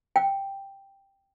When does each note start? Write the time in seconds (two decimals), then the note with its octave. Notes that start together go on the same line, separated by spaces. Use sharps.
0.16 G5